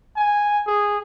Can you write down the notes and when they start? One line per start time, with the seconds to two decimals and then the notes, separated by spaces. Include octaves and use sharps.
0.17 G#5
0.67 G#4